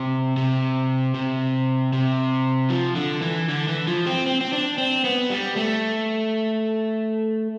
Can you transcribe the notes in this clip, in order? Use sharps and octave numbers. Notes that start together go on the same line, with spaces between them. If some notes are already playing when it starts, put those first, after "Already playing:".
Already playing: C3
C3
C3
C3
F3
D3
E3
D3
E3
F3
C4
C4
C4
D4
C4
B3
G3
A3